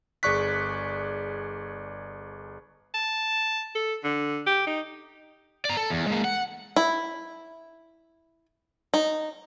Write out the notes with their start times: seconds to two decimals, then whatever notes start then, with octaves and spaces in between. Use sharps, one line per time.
0.23 G1 G#4 D5 C#6 F#6 B6
2.94 A5
3.75 A4
4.04 D3
4.46 G4
4.67 D#4
5.65 D5 A#5
5.77 A4
5.90 E2
6.07 G#3 A#3
6.25 F#5
6.76 E4
8.94 D#4